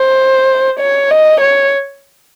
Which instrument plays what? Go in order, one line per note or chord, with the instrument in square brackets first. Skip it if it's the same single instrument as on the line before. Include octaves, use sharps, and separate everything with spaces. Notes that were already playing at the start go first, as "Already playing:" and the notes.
Already playing: [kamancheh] C5
C#5
D#5
C#5